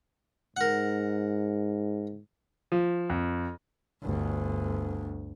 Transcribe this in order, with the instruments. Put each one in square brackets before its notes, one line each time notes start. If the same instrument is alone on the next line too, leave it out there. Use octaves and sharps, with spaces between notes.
[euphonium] G#2 [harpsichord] A#4 F#5
[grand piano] F3
F2
[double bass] G1 D2